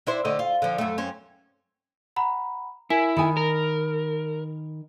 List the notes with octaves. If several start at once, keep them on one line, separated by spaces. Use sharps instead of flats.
D4 E4 C5
D3 A3 D#5
F4
D3 F3
F#2 A3
F#2 C4 C#4
F#5 A#5 B5
E4 A#4 G#5 B6
D#3 G#5 B5 D#6
A#4